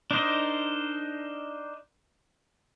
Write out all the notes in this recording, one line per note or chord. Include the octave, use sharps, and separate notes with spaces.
D4 D#4 A#4 C5 D#5